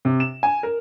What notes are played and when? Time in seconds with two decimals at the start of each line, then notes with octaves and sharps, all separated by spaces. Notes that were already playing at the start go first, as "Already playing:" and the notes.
0.05 C3
0.20 E7
0.43 G#5
0.63 A#4